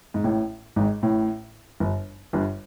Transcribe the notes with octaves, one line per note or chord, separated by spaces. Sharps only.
G#2
A1 A2
G#1 G#2
A1 A2
G1 G2
G1 G2